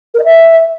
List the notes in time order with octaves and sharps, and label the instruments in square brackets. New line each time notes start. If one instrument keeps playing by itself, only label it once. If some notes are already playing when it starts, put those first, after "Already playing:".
[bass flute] A#4
D#5
E5